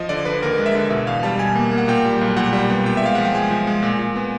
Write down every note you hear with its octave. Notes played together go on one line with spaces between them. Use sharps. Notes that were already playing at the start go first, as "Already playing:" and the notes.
Already playing: F3 D#5
D3 D5
D3 B4
D#2 A#4
G#3
E5
D3
B2 E5
E2 F5
G3 A5
B2 G#5
A#3
A#3
F#5
A#2 G5
G3
B1
A#2 F#5
G3
B3
A#2 G5
E5
G#3 F5
F3 F#5
G5
G#3 G#5
F3
G#3
A#2
A#2
B3